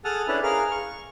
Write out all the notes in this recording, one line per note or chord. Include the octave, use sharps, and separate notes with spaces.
G#4 A4 F#5 A5 D#6 F6
C#4 D4 E4 A4 B4
G#4 A#4 F5 F6
C#6